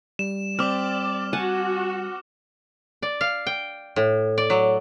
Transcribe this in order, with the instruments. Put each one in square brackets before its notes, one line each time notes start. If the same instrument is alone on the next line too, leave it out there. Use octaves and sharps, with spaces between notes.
[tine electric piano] G3 [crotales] E7
[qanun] C4 [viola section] D5 [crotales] D6 F6
[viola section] F#4 [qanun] F#5 G#5 A5
[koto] D5
F5
G5
A2
D5
F#3